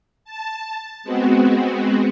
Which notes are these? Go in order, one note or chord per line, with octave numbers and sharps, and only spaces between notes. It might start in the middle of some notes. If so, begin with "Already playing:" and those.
A5
G#3 B3 C4 F#4